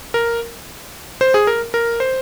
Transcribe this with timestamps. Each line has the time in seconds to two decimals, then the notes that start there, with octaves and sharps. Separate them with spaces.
0.14 A#4
1.21 C5
1.34 G#4
1.47 A#4
1.74 A#4
2.00 C5